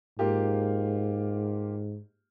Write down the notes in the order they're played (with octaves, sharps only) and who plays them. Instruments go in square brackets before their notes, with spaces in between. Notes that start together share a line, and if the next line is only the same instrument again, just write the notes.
[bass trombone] G#2 [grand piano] A#3 F4 G4